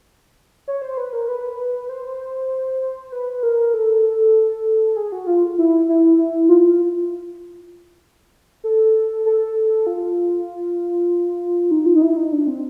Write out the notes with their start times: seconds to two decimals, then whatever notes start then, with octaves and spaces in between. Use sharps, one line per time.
0.68 C#5
0.82 C5
0.97 B4
1.13 A#4
1.28 B4
1.89 C5
3.12 B4
3.43 A#4
3.74 A4
4.96 G#4
5.12 F#4
5.27 F4
5.58 E4
5.89 E4
6.18 E4
6.49 F4
8.64 A4
9.26 A4
9.87 F4
11.71 D#4
11.86 F4
11.96 D#4
12.02 E4
12.17 D#4
12.32 D4
12.47 C4